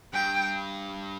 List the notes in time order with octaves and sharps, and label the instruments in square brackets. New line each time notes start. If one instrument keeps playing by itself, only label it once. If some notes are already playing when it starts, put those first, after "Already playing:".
[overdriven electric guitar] G2 [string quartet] G5